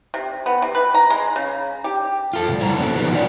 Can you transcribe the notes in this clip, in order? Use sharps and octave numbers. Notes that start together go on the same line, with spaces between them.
C3
B3
C3
B4
A#5
G#3
C#3
G4
F4 A4
B2 G3
E4 C5 A#5
F#3 A#3 C#4 F#4 A4
B2 D#3 F3 G3 B3
F#4 C#5 D5